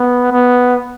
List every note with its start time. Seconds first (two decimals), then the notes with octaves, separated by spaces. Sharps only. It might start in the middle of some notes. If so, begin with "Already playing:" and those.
Already playing: B3
0.32 B3